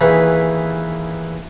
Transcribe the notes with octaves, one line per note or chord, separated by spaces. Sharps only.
D#2 E3 G#4 B4 G#5 C#6